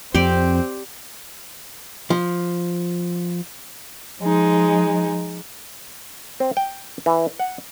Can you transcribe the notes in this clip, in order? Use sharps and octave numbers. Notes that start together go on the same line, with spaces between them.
F2 C4 G4 D5
F3
F3 G#3 D#4
C4
G5
E3
F#5